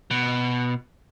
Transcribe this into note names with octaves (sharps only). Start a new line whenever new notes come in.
B2